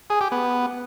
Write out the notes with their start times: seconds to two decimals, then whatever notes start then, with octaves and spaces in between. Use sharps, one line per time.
0.10 G#4
0.21 G4
0.32 B3